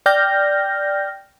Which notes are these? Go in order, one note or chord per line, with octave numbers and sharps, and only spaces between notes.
D5 G5 F6 G6 A#6